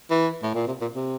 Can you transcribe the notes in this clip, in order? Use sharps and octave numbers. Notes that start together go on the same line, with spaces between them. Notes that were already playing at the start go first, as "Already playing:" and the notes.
E3
A2
A#2
C3
A#2
C3